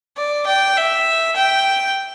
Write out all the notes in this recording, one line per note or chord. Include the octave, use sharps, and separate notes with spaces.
D5
G5
E5
G5